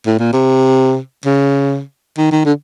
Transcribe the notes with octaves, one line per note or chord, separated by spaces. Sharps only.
A2
A#2
C3
C#3
D#3
D#3
D3